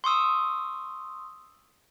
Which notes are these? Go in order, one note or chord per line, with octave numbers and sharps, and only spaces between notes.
C6 C#6 D#6 E6